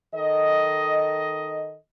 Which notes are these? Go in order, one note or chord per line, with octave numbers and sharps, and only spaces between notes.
D#3 A4 D#5